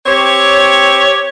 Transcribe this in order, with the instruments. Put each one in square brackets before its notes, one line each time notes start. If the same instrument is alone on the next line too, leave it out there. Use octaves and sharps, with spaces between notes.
[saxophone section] C4 G4 C#5